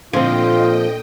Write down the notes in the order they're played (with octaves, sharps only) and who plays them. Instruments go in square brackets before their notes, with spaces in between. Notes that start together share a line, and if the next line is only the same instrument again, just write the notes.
[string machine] A#2 D#5 G5 [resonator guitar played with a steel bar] D3 [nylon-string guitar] F3 C4 [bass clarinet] F4